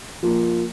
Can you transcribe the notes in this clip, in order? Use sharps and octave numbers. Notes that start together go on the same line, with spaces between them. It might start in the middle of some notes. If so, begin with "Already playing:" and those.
F3 A#3